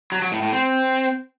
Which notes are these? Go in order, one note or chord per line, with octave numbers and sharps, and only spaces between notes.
F#3
F#3
A2
A2
C4